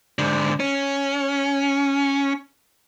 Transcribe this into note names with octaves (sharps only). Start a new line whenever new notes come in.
G#2 D3
C#4